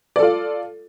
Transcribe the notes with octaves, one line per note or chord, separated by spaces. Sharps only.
F4 A4 D5